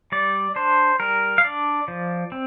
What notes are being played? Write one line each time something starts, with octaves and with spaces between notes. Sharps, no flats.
G3 D5
D4 C5
G3 A#4
F5
D4 D5
F3
C4